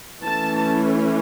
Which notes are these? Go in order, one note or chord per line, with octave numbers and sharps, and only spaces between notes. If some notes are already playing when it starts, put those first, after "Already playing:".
E3 A3 C#4 A5